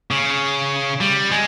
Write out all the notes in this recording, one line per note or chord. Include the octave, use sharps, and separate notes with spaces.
C#3
G3
G#3